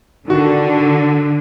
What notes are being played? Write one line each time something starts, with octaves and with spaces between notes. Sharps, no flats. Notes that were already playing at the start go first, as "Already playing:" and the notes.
D3 D#3 F#4